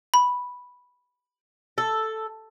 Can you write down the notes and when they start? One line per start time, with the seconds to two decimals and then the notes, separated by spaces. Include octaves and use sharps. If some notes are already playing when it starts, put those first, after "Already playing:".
0.14 B5
1.78 A4